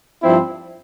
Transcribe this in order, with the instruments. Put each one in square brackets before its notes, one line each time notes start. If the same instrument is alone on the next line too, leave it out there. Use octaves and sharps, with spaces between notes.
[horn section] G2 F3 C4 E4